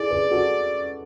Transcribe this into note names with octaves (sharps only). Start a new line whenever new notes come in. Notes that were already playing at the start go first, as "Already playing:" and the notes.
Already playing: E4 G#4 A4 D5
G#4 B4
F#4 A4